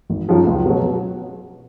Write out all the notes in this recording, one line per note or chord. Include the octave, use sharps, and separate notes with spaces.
G#1
F#2 F3
C#2
B2 F#3